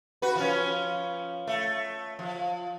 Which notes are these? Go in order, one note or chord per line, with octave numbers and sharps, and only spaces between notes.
F#4 B4
F3 C#4
A3
F3